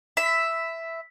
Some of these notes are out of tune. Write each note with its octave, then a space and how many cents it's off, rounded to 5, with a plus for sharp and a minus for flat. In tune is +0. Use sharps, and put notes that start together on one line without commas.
E5 +0 B5 +35